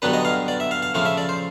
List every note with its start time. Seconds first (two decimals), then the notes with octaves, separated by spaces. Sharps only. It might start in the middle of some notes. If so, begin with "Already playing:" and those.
0.02 G2 D3 F#3 B3 D4 B4
0.13 D#5
0.25 F5
0.48 D5
0.60 E5
0.71 F5
0.82 F5
0.94 C#3 F3 A3 F5
1.05 E5
1.18 D5
1.29 C5